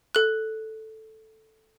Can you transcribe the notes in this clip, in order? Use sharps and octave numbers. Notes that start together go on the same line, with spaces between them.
A4 F#6